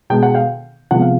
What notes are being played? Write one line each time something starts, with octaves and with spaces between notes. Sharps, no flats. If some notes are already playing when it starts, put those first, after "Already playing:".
B2 G#3 B3 G5
F#5
F5 G5
C3 F3 G#3 B3 F#5
F5